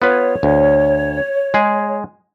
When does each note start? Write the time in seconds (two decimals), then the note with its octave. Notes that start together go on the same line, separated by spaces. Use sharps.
0.02 B3 F4 B4 C#5
0.43 D2
1.54 G#3 G#4